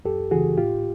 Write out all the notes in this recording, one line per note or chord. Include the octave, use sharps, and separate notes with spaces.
F#2 G4 A4
C#3 E3 F#4 G#4
A2 F4 G4